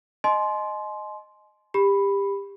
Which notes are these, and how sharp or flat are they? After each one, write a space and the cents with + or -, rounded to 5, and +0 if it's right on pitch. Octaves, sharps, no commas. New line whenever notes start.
D#5 -10 G#5 +40 C6 +0
G4 +20 B5 +0